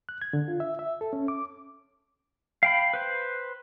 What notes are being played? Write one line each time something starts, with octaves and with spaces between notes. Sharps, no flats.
F#6
G#6
D3
F4
E5
E5
A4
C#4
D6
F5 G5 B5
B4 C5